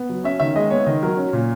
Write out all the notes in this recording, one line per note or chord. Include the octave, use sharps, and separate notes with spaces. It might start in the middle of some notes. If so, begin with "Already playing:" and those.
Already playing: B3
F#3
C#4 E5
D#3 E5
G#3 D#5
B3 C#5
D#3 D#5
F#3 A#4
C#4
A#2